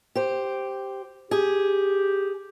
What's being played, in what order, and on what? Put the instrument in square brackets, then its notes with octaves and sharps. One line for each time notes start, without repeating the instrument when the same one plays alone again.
[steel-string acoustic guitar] G4 C5
[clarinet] G4 [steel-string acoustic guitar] G#4